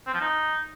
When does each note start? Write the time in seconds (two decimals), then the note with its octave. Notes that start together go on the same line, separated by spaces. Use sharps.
0.07 C4
0.14 F3
0.21 D#4